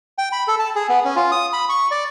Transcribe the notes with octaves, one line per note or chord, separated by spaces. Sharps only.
G5
B5
A4
A5
G#4
B3
C#4
F4
D#6
B5
C#6
D5